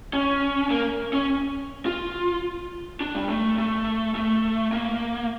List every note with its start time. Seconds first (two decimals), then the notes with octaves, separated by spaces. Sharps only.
0.13 C#4
0.71 A#3
1.13 C#4
1.86 F4
3.00 D4
3.15 G3
3.29 A3
3.58 A3
4.15 A3
4.72 A#3